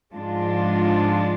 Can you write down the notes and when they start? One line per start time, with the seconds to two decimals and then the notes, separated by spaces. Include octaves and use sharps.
0.14 G#2 F3 G#3 D4 F4